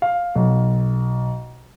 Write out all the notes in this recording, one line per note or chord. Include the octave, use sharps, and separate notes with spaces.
F5
B1